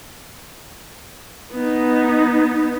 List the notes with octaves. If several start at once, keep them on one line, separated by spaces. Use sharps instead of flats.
B3 D#4